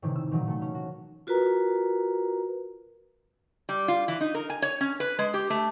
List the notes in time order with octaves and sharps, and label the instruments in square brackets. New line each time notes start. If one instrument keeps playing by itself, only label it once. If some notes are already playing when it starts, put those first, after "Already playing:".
[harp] A2 C3 D#3 E3
E6
A#2 D#3 E3 F#3
A3 A4
C#4
F#4
[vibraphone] F4 F#4 A#4 B4 A#5
[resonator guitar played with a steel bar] G3
F4
E3
D#4
A#4
G#5
C#5
C#4
B4
G#3
G4
A3